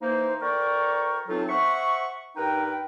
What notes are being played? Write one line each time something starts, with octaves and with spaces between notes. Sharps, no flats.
E3 A#3 D#4 C5
D2 A#4 D5 G5 A#5 C#6
E3 F#3 C4 D#4 F4 A4
C5 E5 F#5 C#6
G2 D#4 A#4 B4 G5